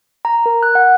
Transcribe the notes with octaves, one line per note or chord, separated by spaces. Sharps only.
A#5
A#4
F#6
F#5